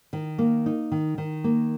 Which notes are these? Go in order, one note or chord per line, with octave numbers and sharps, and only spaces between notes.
D#3
A#3
D#4
D#3
D#3
A#3